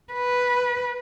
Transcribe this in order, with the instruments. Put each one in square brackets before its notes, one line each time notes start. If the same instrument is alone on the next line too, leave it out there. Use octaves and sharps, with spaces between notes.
[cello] B4